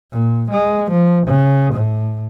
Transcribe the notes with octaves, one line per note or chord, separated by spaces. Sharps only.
A#2
G#3
F3
C#3
A2